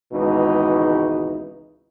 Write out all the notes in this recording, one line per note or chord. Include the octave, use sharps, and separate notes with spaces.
G#1 C#2 B2 E3 D#4